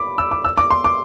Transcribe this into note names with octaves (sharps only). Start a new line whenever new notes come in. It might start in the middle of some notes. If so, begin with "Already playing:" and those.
Already playing: B5 D6
E6
D6
E6
D6
C6
D6